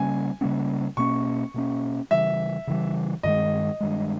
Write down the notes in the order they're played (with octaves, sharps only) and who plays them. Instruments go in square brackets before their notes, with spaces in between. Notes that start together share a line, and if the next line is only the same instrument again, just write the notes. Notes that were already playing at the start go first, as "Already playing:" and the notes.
Already playing: [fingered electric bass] C#3 G3 A#3 C#4 [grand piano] G#5
[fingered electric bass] C#3 G3 A#3 C#4
[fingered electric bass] B2 A#3 C#4 [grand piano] C#6
[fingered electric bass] B2 A#3 C#4
[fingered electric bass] C#3 E3 G3 [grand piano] E5
[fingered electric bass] C#3 E3 G3
[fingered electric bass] G2 D#3 G#3 [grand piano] D#5
[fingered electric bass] G2 D#3 G#3